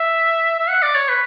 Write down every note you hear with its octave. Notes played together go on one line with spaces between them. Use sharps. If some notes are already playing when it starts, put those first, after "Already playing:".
Already playing: E5
E5
F#5
D5
C#5
B4